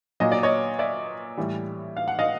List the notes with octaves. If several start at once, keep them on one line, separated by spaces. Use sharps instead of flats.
A#2 F#3 D#5
D5
C#5 D#5
D5 E5
A2 E3 G3
F5
F#5
D#5 F5